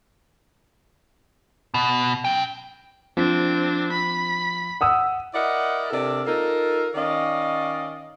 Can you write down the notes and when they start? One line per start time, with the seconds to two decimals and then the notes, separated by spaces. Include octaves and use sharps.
1.74 B2
2.25 C#4 G5
3.17 F3 C4 D4
3.92 B5
4.81 F#5 D#6 E6
5.33 E4 A#4 D5 D#5 F#5
5.91 C3 D4 A4 A#4 D5
6.26 D#4 F4 A4 A#4
6.95 D#3 C#4 D5 D#5 F5